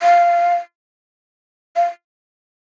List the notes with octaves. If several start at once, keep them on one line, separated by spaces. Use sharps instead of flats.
F5
F5